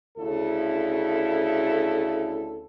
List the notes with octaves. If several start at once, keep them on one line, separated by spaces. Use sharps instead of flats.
D2 C#3 E4 A4